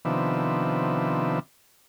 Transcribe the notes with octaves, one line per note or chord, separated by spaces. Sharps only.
C3 D#3 F3 B3 D4 E5